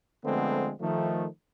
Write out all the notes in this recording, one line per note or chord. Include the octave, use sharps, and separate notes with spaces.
D3 F3 G#3 A3 B3 C4
D#3 F3 A3